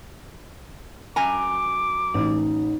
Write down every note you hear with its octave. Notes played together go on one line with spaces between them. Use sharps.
F#2 G#5 A#5 D6
A1 D#4